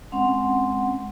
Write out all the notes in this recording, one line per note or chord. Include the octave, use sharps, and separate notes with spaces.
G#3 C4 C#4 F#5 C6